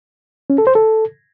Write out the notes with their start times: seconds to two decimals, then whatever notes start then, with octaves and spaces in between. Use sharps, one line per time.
0.50 C#4
0.58 A4
0.67 C5
0.75 A4